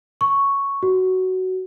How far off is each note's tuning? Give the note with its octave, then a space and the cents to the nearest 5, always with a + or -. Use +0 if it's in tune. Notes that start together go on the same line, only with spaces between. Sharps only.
C#6 +0
F#4 +10